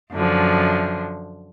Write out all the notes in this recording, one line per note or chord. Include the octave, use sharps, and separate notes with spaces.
F#2 D3 F3